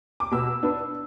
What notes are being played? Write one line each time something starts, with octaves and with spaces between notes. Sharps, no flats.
D6
B2 E6
B3 D4